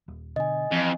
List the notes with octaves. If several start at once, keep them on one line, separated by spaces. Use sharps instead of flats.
D#1
B2 D3 D#5 G#5
F2 E3